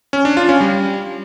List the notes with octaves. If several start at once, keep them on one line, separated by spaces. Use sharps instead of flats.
C#4
D4
F4
C#4
G3